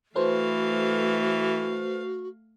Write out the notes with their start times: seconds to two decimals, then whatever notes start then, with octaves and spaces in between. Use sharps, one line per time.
0.15 E3 A3 F#4 A4 B4 C5 F5